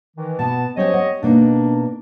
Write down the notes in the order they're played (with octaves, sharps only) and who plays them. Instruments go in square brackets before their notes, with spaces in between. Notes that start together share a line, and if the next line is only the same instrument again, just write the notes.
[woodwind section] D#3 E3
[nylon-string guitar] B2 [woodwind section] B3 A5
[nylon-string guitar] F#3 C#4 C5 [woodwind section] G4 C#5 D#5
[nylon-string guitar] F#5
[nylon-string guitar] B2 A#3 D#4 [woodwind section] D4